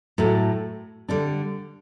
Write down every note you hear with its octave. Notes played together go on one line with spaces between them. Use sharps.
A2 F#3 A3
D3 G3 D4